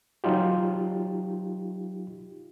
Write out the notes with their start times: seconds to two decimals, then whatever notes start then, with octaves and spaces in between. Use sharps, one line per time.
0.24 F#3 D#4 F4 G4